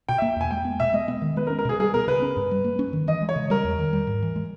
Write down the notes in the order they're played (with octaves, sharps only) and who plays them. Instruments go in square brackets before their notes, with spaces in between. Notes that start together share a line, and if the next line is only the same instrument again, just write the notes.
[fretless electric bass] B2 [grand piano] G5
[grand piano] E5
[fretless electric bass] A#3
[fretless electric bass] E2 [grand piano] G#5
[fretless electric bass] G#3 [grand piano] G5
[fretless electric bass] B3
[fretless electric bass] B2 [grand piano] E5
[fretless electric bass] G#3 [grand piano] D#5
[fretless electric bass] B3
D#3
[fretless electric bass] G#3 [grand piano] B4
[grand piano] A#4
[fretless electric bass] C#4
[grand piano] A#4
[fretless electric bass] B2 [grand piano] G#4
[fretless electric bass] G3 [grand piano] G#4
[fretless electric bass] B3 [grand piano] A#4
[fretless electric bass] C#3 [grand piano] B4
[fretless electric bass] C#4
G2
G3
A#3
C#4
D#3
[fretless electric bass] E3 [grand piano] D#5
[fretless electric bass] G#3
[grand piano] C#5
[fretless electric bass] C#3
[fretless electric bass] G3 [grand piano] A#4
[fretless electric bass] E2
D#3
G3
G#2
E3
G#3